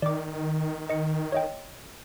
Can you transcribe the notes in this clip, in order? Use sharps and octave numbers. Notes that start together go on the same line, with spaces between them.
D#3 D5 D6
D#5 C#7
C#5 D#5 G5